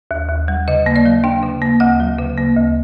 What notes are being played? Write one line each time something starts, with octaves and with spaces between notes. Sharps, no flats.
D#2
D#2
G3
C#3 D#5
A#3
D5
F#3
D4 G5
C#3
A#3
D2 F#5
F#3
C#3
A#3
D2